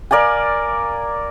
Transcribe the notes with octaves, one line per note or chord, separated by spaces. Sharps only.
A#4 D5 F5 G#5